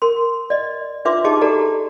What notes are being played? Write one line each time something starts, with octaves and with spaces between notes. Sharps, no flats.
A#4 C6
D5 D#5
D4 F4 B4 E5 C6 D6
D#4 G4 G#4 D#5 A5 D6
F#4 G4 A4 D5 A#5